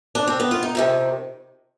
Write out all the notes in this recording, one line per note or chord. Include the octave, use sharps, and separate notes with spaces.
D4
C4
B3
F4
D#4
F2 C3 D#3